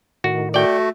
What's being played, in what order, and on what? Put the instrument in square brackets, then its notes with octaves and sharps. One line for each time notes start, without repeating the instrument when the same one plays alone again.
[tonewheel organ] A2 D#3 [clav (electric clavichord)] F#4
[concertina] A3 [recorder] F#4 [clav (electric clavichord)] D5 G5